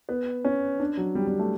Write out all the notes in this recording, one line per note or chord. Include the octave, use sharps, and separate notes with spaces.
B3
C#4
D4
F#3
G3
G3
A3